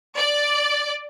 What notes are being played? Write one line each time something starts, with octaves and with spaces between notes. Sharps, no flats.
D5